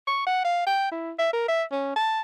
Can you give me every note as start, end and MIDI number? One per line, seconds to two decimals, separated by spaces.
0.07 0.22 85
0.27 0.43 78
0.44 0.62 77
0.67 0.91 79
0.92 1.12 64
1.19 1.32 76
1.33 1.48 70
1.48 1.63 76
1.72 1.96 61
1.96 2.21 81